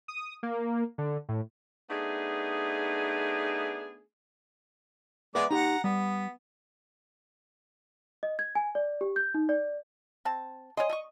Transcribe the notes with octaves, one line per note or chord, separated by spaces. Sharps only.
D#6
A#3
D3
A2
A3 B3 D4 D#4 G#4
G#3 B4 D5 E5 F#5
D#4 G4 F#5 A#5
G3 B3
D#5
G#6
G#5
D5
G4
G6
D#4
D5
C4 A5
C#5 D#5 G#5 C6
A3 C#6